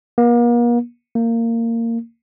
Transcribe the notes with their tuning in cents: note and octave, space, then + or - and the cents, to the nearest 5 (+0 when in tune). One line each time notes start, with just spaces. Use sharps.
A#3 +40
A#3 -20